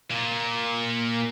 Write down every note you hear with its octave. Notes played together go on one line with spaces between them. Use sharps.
A#2